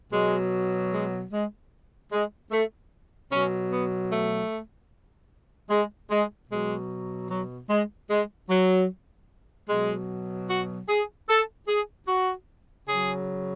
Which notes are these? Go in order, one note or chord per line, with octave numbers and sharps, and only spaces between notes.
B2 F#3 G#3
G#3
G#3
G#3
A3
B2 F#3 C#4
B3
A3
G#3
G#3
B2 F#3 G#3
F#3
G#3
G#3
F#3
B2 F#3 G#3
F#4
G#4
A4
G#4
F#4
C#3 F#3 G#4